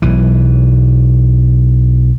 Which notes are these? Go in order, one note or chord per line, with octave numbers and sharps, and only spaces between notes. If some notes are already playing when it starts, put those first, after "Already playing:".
B1 E3